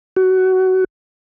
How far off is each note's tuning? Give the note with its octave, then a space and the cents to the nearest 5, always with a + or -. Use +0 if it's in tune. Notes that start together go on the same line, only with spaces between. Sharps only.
F#4 +20